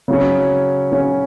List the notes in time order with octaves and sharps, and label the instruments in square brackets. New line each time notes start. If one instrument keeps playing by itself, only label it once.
[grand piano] C#3 F#3 C#4
C#3 F#3 C#4